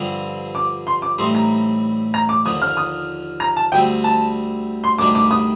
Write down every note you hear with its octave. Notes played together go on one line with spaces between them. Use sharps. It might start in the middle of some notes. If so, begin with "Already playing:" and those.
Already playing: G2 D3 F3 C4
D6
C6
D6
A1 A2 G3 C4 D#4 C6
A#5
A#5
D6
D#2 D3 F3 D#6
F6
D#6
A#5
A5
D2 D3 G3 C4 G5
A5
C6
D2 C3 D#3 G3 D4 D6
D6
D#6